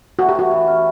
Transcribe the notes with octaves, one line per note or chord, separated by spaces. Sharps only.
A3 F#4
G4
E3 F#4
E3
C#4